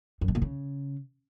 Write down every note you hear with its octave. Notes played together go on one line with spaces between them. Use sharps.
F#2
B2
A#2
C#3